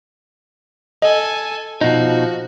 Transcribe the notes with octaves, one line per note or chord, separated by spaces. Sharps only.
A4 D#5 G#5
B2 F3 D#4 F#4